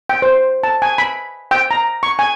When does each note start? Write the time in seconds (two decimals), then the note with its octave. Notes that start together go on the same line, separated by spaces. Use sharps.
0.09 G5
0.22 C5
0.63 A5
0.82 G#5
0.98 B5
1.51 G5
1.71 A#5
2.03 C#6
2.19 G#5